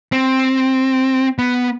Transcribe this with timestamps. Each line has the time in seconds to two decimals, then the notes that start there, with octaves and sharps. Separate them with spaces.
0.12 C4
1.39 B3